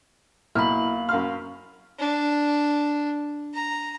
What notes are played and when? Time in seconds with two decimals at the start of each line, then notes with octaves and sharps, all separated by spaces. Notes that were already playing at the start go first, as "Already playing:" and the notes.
0.55 B1 A#3 E4 B5 F6
1.09 F#2 F5 C6 F6
1.99 D4
3.54 A#5